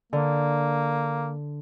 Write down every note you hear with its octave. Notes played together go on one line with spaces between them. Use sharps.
D3 A#3